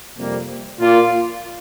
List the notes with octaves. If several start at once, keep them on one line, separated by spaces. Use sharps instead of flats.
F2 C3 G3 A#3
A#2 A#3 F4 D5